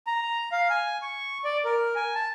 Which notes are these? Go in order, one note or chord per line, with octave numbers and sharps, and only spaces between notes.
A#5
F5
G#5
C#6
D5
A#4
G#5
A5